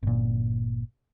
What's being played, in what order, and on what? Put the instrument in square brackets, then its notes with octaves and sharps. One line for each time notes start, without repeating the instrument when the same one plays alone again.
[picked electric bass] G1 A#2